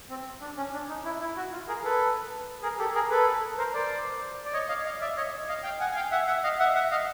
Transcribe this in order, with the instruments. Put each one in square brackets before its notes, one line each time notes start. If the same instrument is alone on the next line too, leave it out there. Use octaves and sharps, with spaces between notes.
[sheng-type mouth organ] C4
D4
C#4
D4
D#4
E4
E4
F#4
F4
G#4 A#4
A4 B4
G#4 A#4
G4 A4
G#4 A#4
A4 B4
A#4 C5
C5 D5
D5
C#5 D#5
D#5 F5
D#5 F5
D5 E5
C#5 D#5
D#5 F5
F5 G5
F#5 G#5
G#5
F5 G5
E5 F#5
E5 F#5
D#5 F5
E5 F#5
E5 F#5
D#5 F5